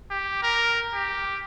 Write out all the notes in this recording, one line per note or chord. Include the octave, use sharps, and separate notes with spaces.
G4
A#4
G4